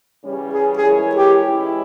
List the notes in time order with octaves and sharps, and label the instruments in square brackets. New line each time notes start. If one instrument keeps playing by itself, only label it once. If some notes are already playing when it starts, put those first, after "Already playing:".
[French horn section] C#3 E3 G3 C#4
[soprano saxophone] G#4
G#4
[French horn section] E3 G#3 E4 A#4 C#5
[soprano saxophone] G4
[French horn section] E3 G#3 C#4 E4